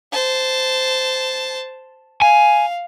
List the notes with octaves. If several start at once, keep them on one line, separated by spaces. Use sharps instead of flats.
C5 A5
F5 G#5